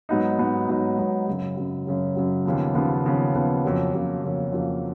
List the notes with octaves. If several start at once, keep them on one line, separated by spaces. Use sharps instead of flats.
G#2 F#3 B3 D#4
G#2 F#3 B3 D#4
G#2 F#3 B3 D#4
G#2 F#3 B3 D#4
F#2 C#3 F#3
F#2 C#3 F#3
F#2 C#3 F#3
F#2 C#3 F#3
D#2 C#3 F3 B3
D#2 C#3 F3 B3
D#2 C#3 F3 B3
D#2 C#3 F3 B3
F2 C#3 F#3 A#3
F2 C#3 F#3 A#3
F2 C#3 F#3 A#3
F2 C#3 F#3 A#3